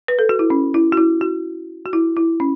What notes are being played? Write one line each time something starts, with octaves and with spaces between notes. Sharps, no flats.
B4
A4
F#4
E4
C#4
E4
F#4
E4
F#4
F#4
E4
E4
C#4